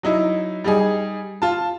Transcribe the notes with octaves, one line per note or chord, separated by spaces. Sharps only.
F#3 D#4 E4
G3 D#4 G#4
F4 A5